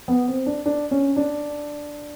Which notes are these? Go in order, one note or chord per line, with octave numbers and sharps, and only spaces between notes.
B3
C4
D4
D4
C#4
D4